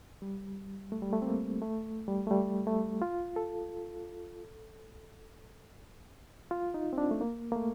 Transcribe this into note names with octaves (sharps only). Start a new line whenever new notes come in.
G3
A3
G3
A3
C4
A#3
A3
G3
A3
G3
A3
F4
A4
F4
D#4
C4
D4
A3
A#3
A#3
A3